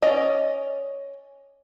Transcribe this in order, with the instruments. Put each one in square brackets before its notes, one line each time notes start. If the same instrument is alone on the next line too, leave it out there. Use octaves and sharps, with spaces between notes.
[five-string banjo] C#4 D5 D#5